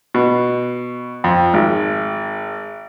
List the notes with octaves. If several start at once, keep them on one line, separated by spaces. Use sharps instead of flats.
B2
F2
G#1